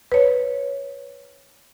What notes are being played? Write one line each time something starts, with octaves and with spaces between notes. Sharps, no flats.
B4 C#5